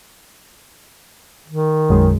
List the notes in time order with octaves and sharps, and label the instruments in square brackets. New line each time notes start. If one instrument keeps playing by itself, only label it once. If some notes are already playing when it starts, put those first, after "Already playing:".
[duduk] D#3
[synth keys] B1 F#2 G#3